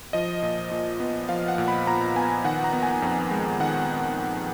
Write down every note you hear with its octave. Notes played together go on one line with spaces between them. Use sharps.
F3 D#5
A#2
A#2
B3
F3 F5
F#5
A#2
B5
A#2 A#5
B3 G#5
D#3 F#5
A#5
B3
G#5
F2
G#3
D#3 F#5